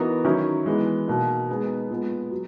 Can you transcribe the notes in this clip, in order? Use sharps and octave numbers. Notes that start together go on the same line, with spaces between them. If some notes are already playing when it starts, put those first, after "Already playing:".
Already playing: E3 B3 D#4 F#4 A#4
D#3 F#3 C#4 E4 A#4
E3 G#3 B3
B2 A#3 D#4
G#3 B3 D#4 G#4
A#2 G#3 B3
F#3